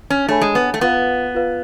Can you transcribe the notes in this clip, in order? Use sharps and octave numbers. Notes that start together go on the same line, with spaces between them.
C#4
A3 D4 G#4 C#5 G#5 B5
G#3
B3
A3
B3 F4 B4 F5
F4 B4 F5